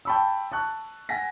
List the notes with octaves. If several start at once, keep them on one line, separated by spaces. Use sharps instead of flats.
G5 A5 B5 C#6 E6
A5 C#6 F#6
F#5 G#5 A#6 B6